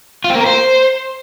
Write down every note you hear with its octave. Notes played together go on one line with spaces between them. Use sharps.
F4
C4
A#3
A#4
C5